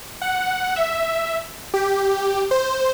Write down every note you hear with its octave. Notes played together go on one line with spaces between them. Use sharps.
F#5
E5
G4
C5